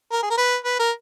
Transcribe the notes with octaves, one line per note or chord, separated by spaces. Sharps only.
A#4
G#4
A#4
B4
B4
A#4